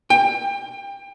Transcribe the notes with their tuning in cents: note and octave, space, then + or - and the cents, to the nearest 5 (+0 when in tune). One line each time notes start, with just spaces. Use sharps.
G5 +25